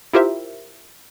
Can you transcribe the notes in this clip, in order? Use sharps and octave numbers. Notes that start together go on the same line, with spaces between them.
E4 F4 G4 A#4 C5 E5